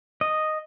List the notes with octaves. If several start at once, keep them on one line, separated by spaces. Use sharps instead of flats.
D#5